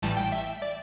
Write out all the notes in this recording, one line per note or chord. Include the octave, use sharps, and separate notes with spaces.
A1 A2 E3 G3 A5
G5
E5
D5